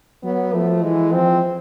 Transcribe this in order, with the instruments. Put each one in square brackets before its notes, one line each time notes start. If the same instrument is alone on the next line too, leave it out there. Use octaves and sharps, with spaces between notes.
[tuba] F#3 [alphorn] B3
[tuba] F3 [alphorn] A3
[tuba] E3 [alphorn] G#3
[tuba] F3 [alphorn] C4